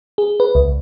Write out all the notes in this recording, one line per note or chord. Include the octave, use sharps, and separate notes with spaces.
G#4
B4
C#2